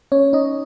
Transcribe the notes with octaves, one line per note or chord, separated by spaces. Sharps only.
C#4 C#5
D#4 D#5